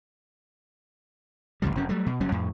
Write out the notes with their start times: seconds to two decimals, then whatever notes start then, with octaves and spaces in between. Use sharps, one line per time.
1.62 A1 D2 C#3 G3
1.76 F1 F#2 C#4
1.89 F#3 G3 A3
2.06 B2
2.20 F#1 F#3 G3 C#4
2.32 F2 A2